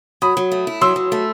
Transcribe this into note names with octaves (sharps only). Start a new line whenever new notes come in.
F#3 B5 D#6
F#3
A3
E4
F#3 C6 E6
F#3
A3